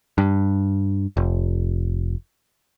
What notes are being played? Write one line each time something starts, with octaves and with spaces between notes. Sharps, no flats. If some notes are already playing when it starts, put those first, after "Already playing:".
G2
F1